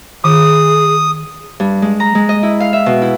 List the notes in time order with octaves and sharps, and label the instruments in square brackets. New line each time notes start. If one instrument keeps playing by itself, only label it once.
[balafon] D#3 [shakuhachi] G#4 [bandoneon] D#6
[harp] G2
G#3
A#5
G#3
D#5
E4
F5
E5
B2
E4